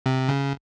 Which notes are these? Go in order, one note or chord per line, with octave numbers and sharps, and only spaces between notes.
C3
C#3